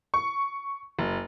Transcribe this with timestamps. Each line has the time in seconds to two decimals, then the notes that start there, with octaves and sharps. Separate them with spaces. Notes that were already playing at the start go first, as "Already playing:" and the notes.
0.14 C#6
0.99 F#1